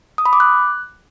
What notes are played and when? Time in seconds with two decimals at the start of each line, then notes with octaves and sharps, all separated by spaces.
0.18 D#6
0.26 B5
0.33 D6
0.40 F#6